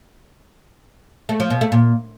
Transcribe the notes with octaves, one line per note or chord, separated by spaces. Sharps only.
A3
F3
B2
A3
A#2